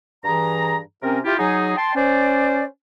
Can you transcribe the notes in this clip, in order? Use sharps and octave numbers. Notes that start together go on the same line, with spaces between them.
G2 E3 G#4 A#5
C3 C4 C#4 A#4
E4 F4 G4
F#3 D#4 G#4
G5 A5 C6
C#4 C5 D5